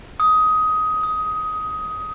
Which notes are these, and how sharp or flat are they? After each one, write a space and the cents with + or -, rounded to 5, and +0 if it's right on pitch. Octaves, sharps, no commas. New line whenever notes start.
D#6 +15
D#6 +30